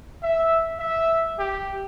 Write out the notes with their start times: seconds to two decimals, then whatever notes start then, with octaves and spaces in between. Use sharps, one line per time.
0.23 E5
0.79 E5
1.39 G4